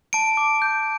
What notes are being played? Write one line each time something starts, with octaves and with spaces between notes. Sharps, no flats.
A5 D7
D6
G6